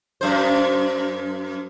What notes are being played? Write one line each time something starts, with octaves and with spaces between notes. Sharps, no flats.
F#2 C5